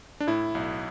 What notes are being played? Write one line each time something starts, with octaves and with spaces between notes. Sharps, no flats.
D4
A2 E4
B1